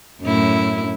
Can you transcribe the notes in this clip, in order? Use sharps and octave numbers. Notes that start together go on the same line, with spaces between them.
F#2 A2 E4